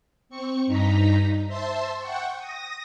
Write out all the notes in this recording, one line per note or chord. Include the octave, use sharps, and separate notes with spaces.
C4 C#6 C#7
G2 D#4 A#5 B6
C5 E5 A5 C6
F#5 G5 C#6
D#6 A#6